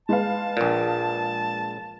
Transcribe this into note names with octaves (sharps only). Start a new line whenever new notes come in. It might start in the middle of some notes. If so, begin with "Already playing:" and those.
G#3 B4 F5 A5
A#1 A#2